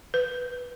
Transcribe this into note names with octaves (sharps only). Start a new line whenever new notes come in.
B4